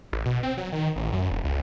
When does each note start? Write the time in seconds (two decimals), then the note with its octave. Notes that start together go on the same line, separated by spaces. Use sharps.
0.13 A1
0.25 B2
0.43 C4
0.57 F#3
0.72 D#3
0.96 A1
1.12 F#2
1.31 E1
1.44 C#2